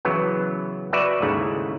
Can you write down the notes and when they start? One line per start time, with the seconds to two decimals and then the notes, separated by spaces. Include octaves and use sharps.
0.05 C#3 E3 F#3 B3
0.93 F#4 B4 D5 E5 F#5
1.22 D#2 G#2 C#3 A3 E4 F#5